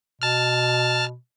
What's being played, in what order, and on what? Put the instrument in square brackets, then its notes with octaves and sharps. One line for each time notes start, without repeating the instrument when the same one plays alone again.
[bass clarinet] B2 [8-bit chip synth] A5 F6